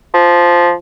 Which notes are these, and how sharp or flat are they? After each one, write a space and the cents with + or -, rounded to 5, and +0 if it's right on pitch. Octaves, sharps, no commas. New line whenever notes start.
F3 -5